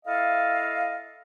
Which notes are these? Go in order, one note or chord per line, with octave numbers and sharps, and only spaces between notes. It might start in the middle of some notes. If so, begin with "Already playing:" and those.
E4 A4 D#5 F5